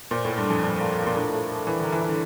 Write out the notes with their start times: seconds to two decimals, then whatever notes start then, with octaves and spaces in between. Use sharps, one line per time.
0.11 A#2 C5
0.25 A2 A4
0.37 G2
0.47 F2 D4
0.63 G2 D4
0.81 A#3
0.98 F3
1.07 A#2
1.15 A2 D4
1.33 A3
1.50 F3
1.67 E3 D5
1.80 D3 A#4
1.92 E3
2.01 E4
2.09 D3